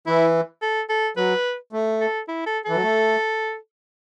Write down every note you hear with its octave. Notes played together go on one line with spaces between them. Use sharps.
E3 E4
A4
A4
F#3 B4
A3
A4
E4
A4
E3 A4
F#3
A3